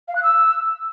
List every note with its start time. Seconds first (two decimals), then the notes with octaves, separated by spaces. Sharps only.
0.08 F5
0.15 F#6
0.23 E6